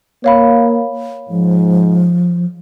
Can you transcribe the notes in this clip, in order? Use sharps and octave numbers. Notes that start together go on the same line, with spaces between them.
A#3 C#5 F5 B5
G#2 F3